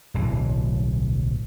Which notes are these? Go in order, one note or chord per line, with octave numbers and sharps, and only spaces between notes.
D1 B1 E3